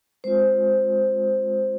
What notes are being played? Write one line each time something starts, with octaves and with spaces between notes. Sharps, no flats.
G#3 C4 F4 C5